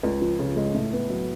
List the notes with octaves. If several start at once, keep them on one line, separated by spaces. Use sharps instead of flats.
C#2
F3
C#3
G#3
A2
B3
F#3